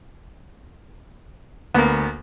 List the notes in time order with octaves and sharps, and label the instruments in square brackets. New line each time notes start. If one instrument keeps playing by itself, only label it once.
[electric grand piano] D2 [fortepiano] A#3 B3